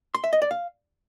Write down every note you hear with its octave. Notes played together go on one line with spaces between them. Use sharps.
C6
E5
D#5
D5
F5